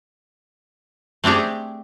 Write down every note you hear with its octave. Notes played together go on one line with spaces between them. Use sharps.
A3 C4 D4 G4 G#4